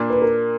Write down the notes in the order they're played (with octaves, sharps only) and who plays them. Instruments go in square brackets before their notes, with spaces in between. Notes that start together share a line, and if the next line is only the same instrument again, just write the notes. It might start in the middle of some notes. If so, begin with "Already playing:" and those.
Already playing: [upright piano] A#2 A#3 D4
[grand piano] B4
A#4